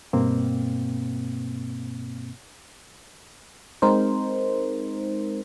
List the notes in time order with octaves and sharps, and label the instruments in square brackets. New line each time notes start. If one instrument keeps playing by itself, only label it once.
[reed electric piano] G2 B2 A#3 C4
[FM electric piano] G#3 C4 D#4 A#4 C5